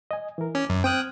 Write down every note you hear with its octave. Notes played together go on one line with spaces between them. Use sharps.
D#5 G#5
E3 A#4
C#4 D6
F#2
C4 G5 D#6 F6 F#6 G#6